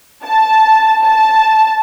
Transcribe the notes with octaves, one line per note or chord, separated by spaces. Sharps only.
A5
A5